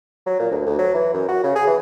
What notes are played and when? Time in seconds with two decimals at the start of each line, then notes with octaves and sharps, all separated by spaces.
0.26 F#3
0.39 A#2
0.51 D2
0.66 D2
0.79 F#3
0.94 E3
1.14 F#2
1.29 F#4
1.44 C#3
1.56 G#4
1.67 E3